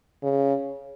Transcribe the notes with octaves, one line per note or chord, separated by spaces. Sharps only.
C#3